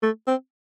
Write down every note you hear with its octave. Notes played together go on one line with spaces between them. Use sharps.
A3
C4